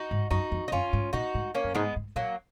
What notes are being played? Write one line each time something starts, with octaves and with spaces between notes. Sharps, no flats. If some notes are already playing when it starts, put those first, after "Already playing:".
Already playing: D#4 F#4
G#2
F#2 D#4 F#4
F2
D#4
F#2 C#4 F4
G#2
A#2 D#4 F#4
G#2
A#3 C#4
F#2
G#2 G#3 B3
G#2
A#2 F#3 A#3